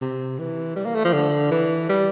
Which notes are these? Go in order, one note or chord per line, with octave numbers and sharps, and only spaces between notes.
C3
E3
G3
A#3
A3
F3
D3
E3
G3